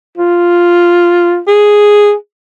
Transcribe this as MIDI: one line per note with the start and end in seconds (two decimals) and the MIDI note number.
0.18 1.39 65
1.47 2.13 68